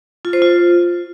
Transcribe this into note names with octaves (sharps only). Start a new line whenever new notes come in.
F4
C5
F4